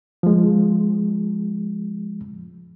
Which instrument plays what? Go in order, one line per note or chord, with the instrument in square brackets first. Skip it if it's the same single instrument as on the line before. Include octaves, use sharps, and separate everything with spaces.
[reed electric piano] F3 G#3